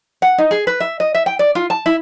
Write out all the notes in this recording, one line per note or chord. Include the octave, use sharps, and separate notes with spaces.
F#5
D#4
G#4
B4
E5
D#5
E5
G5
D5
F4
A5
E4